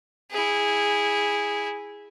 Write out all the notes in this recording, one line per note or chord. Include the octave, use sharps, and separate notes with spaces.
E4 G#4